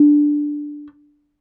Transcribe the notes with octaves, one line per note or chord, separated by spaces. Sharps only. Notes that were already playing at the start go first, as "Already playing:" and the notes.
Already playing: D4